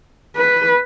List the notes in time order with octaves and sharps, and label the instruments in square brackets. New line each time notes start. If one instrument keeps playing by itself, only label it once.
[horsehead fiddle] B4